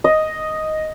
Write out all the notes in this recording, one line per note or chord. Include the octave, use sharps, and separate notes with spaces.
D#5